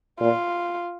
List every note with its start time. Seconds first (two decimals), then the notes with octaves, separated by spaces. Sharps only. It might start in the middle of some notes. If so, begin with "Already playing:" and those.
0.20 A#2 F4